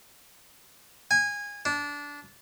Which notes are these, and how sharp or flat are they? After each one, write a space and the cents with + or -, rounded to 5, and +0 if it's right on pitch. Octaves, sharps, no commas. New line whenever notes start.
G#5 -20
D4 -20